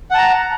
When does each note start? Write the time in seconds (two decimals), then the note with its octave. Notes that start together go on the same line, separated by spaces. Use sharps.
0.11 F#5
0.14 A5
0.18 A#5